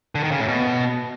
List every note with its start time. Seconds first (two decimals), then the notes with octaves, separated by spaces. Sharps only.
0.15 D3
0.23 D#3
0.32 C#3
0.40 A2
0.48 B2